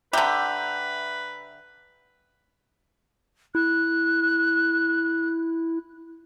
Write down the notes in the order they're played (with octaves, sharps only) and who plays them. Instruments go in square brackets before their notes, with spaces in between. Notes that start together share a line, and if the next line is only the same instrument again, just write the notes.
[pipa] D3 G4 [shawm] B4 [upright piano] E5 A#5 G6
[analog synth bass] E4 [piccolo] F#6